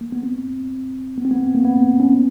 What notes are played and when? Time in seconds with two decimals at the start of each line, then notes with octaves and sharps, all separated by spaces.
0.01 A#3
0.12 B3
0.23 C4
1.18 B3
1.25 C4
1.31 B3
1.55 A#3
1.65 B3
1.76 C4
2.00 C#4